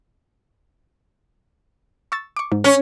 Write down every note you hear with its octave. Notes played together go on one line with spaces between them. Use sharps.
C#6 E6 A6
C#6 D6
G#2
C#4 F6